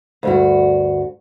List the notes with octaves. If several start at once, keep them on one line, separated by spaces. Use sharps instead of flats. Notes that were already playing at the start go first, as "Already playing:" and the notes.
D2 G2 F#4